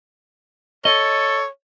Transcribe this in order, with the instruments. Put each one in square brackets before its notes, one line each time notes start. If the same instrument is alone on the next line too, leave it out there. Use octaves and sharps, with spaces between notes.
[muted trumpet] A4 [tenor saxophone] C#5 [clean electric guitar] D#5